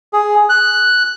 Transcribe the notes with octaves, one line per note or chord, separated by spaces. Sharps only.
G#4
F#6